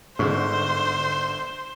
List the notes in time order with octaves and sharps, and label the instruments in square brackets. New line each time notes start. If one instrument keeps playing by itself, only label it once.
[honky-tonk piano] G1 D3 C#6 [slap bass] G#2 [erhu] C5